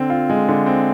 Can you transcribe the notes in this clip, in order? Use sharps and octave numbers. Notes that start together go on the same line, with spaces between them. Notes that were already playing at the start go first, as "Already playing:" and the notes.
Already playing: D3 C4
F4
G#3
D3
C4